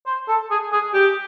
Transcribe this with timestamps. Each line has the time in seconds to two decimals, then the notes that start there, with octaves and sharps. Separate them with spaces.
0.06 C5
0.28 A4
0.51 G#4
0.73 G#4
0.94 G4